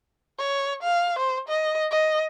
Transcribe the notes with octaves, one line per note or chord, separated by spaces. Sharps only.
C#5
F5
C5
D#5
D#5